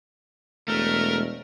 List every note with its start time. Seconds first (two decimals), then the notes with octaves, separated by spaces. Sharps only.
0.68 E1 A3 A#4